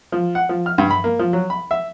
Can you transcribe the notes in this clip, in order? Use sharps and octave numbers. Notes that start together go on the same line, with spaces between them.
F3
F#5
F3
F6
G2
B5
A#3
F3
F#3
B5
E5